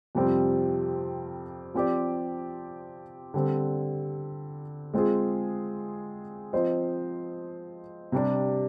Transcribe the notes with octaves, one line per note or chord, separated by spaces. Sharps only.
F2 C3 G3 C4 F4
F3 C4 G4 D5
D3 G3 C4
G#3 C4 F4 G#4
F3 C4 F4 C5 D#5
C3 G3 D4